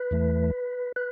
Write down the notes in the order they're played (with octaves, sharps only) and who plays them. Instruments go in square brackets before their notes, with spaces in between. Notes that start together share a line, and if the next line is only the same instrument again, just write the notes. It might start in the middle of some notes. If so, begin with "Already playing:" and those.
Already playing: [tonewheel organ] B4
E2 E3 A3
B4